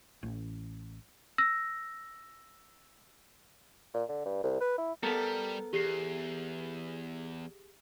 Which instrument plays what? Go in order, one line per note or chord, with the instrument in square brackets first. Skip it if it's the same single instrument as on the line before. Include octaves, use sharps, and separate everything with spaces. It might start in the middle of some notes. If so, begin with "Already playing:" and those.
[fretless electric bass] A1
[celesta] E6 A#6
[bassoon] A#2
D3
G2
C2
B4
E4
[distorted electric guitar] G3 [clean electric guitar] B3 A4 A#4
[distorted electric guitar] E2 [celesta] G4 G#4 C7